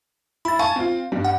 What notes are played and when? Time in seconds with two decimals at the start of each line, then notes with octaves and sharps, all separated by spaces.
0.45 E4 B5 A6
0.59 F5 G#5 A5 C#6
0.76 C4 F4
1.12 G2 G3
1.25 F#5